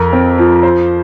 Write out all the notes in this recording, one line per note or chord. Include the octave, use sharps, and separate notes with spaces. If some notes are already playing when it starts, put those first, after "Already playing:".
Already playing: F2 A#4
C4
F3
C5